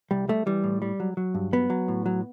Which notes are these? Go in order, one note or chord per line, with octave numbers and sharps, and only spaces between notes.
C2 G3
G3 A3
E3 G3
A2
G3
F#3
F#3
G2
F#3 B3
F#3
A2
F#3